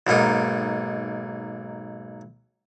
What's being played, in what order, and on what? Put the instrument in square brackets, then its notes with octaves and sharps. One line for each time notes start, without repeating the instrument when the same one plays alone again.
[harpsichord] B1 G#2 A#3 D#4